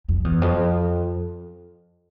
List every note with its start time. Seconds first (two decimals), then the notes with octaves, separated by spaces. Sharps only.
0.09 F2
0.24 E2
0.42 F2